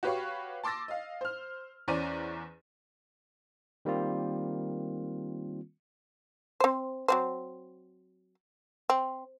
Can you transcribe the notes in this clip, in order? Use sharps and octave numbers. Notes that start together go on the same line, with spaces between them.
F#4 G4 B4 C#5 F5 C#6
A5 C6 D6 E6 A6 A#6
D#5 F5
C5 F6
E2 C#4 C5 D5 A#5 D#7
D#3 G3 A#3 C4 F4
C4 C5
F#3 C4 C5
C4